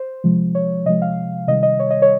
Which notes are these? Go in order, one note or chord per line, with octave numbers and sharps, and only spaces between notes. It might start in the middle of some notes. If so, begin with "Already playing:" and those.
Already playing: C5
C3 F3 G#3
C#5
C3 F3 G#3 D#5
F5
C3 D#3 G3 D#5
D#5
C#5
D#5
C#5